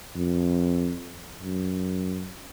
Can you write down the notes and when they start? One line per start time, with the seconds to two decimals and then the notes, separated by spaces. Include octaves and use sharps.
0.16 F2
1.43 F#2